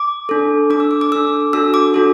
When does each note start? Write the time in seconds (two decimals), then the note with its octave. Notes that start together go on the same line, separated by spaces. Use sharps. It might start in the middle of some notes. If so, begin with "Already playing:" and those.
Already playing: D6
0.29 D4 A4
0.70 D4 A4 D6
0.80 E6
0.91 D6
1.01 D6
1.12 D4 A4 E6
1.53 D4 F#4 A4 E6
1.74 D6
1.94 D4 F#4 A4